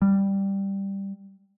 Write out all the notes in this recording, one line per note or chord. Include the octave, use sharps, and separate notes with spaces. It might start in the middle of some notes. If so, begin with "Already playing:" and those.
G3